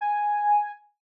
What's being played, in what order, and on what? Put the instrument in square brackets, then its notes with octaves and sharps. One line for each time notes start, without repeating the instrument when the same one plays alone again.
[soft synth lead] G#5